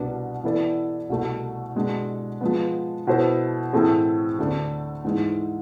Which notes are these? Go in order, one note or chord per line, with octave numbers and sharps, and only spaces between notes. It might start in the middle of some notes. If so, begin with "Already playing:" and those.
Already playing: C2 B2 B3 D4
E3 B3 E4 A4 D5
C2 B2 A3
B2 G#3 D4
F3 G#3 B3
B2 B3 E4 A4 C5
A2 E3 A3 C4 G#4
D2 D3 A3 D4
G#2 E3 G#3